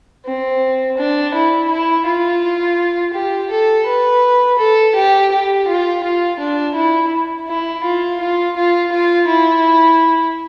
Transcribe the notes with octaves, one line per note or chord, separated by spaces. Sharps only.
C4
D4
E4
E4
F4
G4
A4
B4
A4
G4
G4
F4
F4
D4
E4
E4
F4
F4
F4
F4
E4